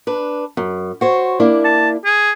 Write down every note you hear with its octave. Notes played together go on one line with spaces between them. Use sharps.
D4 B4
F#2
F#4 C5 C#5
A#3 D4 E4
A5
G#4